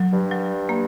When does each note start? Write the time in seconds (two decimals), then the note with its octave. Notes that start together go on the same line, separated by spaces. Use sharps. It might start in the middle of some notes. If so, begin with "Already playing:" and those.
Already playing: F#3
0.13 G2
0.31 F#3
0.69 A#3